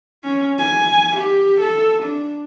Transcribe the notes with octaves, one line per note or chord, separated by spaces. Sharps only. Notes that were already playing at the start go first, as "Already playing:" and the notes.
C#4
G#5
G4
A4
D4